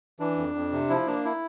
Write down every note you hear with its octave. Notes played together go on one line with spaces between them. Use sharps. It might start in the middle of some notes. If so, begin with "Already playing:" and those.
E3 D4
F2
F2
C3
F3 E4
A#3 D4
E4